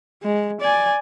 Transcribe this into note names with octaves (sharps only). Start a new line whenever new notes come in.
G#3
D5 G#5